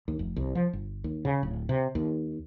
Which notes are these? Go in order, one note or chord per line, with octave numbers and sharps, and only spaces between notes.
D#2
F1
C2
F3
G1
D#2
C#3
D1
C3
D#2